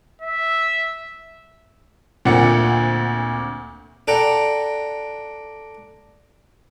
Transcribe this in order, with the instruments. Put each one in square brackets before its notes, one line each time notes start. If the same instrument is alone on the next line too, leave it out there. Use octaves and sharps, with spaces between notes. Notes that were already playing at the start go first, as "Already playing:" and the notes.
[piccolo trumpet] E5
[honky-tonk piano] D2 C4 F#5 [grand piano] A#2 C#7
[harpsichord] D4 A4 F#5 G5 A#5